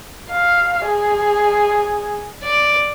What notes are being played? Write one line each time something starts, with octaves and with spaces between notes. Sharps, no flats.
F5
G#4
D5